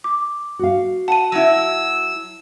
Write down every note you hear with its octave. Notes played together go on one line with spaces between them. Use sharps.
D6
F#4 F5
F#5 A5 D#7
F#3 E4 E6